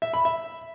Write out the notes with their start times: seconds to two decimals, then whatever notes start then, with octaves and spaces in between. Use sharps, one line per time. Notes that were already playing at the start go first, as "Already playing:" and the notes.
0.02 E5
0.14 B5
0.25 E5